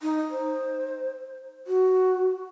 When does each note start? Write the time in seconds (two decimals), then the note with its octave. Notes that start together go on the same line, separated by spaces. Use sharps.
0.01 D#4
0.31 C5
1.67 F#4